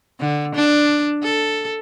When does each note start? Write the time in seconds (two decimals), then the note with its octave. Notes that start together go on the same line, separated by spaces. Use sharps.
0.20 D3
0.55 D4
1.23 A4